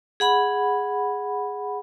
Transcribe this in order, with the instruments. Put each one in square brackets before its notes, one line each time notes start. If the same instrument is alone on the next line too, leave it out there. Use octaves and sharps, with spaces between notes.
[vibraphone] G#4 F#5 B5